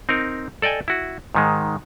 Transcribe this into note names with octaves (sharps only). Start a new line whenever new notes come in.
C4 D#4 A#4
A4 D5 D#5 G5 G#5
E4 F#4
G#2 D#3 G#3